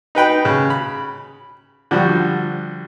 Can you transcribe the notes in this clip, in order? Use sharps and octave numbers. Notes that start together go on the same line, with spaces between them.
D#4 B4 G5 B5
C#3
B5
D3 F3 G3 F#4